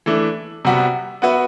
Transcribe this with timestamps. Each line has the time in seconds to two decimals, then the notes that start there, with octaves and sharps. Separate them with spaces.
0.06 E3 A3 D4
0.65 C3 G3 B3 F#4
1.22 B3 F#4 B4 E5